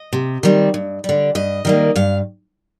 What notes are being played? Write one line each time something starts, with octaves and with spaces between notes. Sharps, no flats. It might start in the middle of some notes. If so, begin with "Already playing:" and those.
Already playing: D#5
C3
D#3 G3 C4
G2
D3 G3
G2 D#5
D#3 G3 A#3
G2 F5